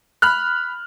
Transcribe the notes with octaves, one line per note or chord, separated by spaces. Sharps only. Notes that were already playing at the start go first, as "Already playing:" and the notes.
B5 F6 F#6